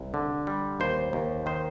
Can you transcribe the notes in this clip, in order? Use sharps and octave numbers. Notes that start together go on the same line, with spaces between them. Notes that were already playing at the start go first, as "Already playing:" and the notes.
Already playing: C2
D3
G3
D#2 C5
D#2
D#3 C5